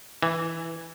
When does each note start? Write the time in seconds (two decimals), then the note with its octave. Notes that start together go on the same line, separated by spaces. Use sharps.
0.23 E3